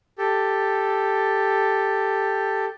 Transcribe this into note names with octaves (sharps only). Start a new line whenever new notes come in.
G4 A4